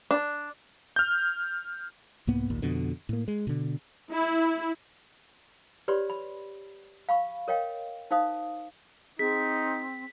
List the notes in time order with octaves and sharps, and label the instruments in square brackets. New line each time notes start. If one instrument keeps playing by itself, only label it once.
[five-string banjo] D4
[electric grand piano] F6 G6
[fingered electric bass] C2 G#2 A#3 B3
A1 D#2 A#2
F2 B2 D3
A2 A#3
G#3
B2 D3
[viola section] E4
[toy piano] G4 B4 C#5 D5 B5 C6
B5
F5 B5 C#6
A#4 C#5 D#5 F5 G5
D#4 C5 F5 D#6
[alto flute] C4 [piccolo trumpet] D#4 [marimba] G#4 [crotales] B6